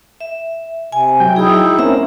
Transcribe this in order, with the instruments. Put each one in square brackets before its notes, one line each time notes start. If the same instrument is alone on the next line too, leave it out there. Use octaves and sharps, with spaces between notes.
[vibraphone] E5
[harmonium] C3 [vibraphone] G#5
[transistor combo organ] F#3 G5
[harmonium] D#4 E4 [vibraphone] G#4 D#6
[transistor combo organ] A#3 C4 C#4 [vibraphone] E5 F#5 A#5